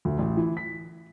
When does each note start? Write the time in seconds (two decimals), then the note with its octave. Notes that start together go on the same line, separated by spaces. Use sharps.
0.05 D2
0.19 A1
0.37 E3
0.57 B6